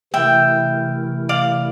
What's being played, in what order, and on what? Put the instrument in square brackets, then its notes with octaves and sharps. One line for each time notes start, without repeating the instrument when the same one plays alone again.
[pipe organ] C3 E3 A3 E4 A#4 [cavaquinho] E5 G5
[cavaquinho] D5 F5